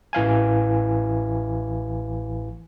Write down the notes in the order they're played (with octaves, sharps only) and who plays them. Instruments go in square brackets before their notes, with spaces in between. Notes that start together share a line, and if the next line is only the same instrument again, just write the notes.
[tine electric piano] A1 E3 F5 G#5